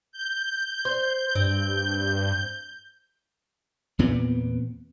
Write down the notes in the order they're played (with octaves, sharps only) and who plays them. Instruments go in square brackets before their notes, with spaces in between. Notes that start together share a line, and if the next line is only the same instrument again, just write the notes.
[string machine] G6
[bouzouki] C5
[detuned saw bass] G2 [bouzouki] C4
[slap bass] E2 A#2 B3 C4